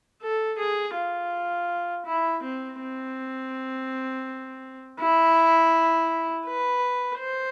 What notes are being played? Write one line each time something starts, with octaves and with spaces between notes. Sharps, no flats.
A4
G#4
F4
E4
C4
C4
E4
B4
C5